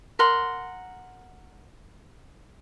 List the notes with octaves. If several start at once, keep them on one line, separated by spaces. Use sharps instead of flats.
A#4 F#5 C6